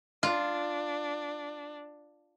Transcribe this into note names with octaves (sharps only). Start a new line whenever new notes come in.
D4 F4